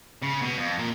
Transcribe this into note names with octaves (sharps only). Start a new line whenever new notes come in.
C#3
B2
F2
A#2